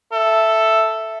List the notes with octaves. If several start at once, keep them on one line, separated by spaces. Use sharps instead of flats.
A4 E5